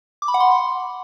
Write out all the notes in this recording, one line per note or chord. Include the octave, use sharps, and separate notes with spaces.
D6
B5
F#5
C6